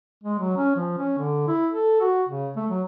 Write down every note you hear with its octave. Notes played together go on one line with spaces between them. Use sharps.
G#3
F#3
C#4
F3
C#4
D3
E4
A4
F#4
C#3
A3
F#3